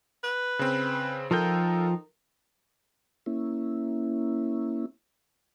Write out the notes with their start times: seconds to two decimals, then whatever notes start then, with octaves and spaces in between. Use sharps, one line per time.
0.24 B4
0.59 C#3 C4
1.31 F3 D#4 F4 A4 A#4 G5
3.26 A#3 C#4 E4